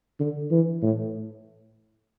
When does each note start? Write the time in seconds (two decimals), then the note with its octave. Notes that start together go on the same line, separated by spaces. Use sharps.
0.20 D3
0.51 E3
0.83 A2